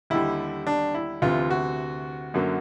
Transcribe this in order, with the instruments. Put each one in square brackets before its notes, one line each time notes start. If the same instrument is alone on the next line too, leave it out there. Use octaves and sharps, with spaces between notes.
[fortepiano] D#2 D3 G3 E4
D4
E4
D2 C3 E3 F4
F#4
F#2 D3 F#3 A#3